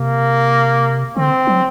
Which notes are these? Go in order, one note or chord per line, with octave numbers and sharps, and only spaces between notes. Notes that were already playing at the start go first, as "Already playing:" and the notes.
Already playing: C3 A#3
D3 C4
F#3